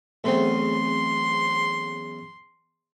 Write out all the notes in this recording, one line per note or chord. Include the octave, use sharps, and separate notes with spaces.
E2 C#3 F#3 A3 C4 C6